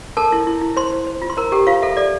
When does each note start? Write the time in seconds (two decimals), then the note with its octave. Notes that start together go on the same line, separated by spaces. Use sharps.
0.17 A4 A#4 A5
0.32 E4
0.47 E4
0.62 E4
0.77 C5 C6
0.92 C5
1.07 C5
1.22 F4
1.30 C6
1.37 A#4 C5 A#5
1.52 G4 A4 G5
1.67 F4 C5 F5
1.82 A4 E5
1.97 A4 D5